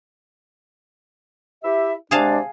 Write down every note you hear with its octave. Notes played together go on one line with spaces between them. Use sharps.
E4 G4 E5
C3 G#3 D4 G#4 F5 A5